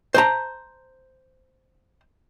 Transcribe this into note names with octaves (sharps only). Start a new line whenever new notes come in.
C5 A5 A#5